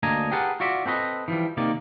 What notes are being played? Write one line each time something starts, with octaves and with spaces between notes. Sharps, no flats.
D2 A#3 D4 D#5 G#5 A#5
G4 G#4 A#4 B4 F#5 A5
F4 F#4 D5 E5
C4 A4 B4 D#5
E3 F3 G3
C3 D#3 A#3 D5